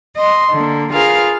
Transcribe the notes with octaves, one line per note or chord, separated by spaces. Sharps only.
D#5 C6
D3 A#3
F4 G#4 A#4 B4 F5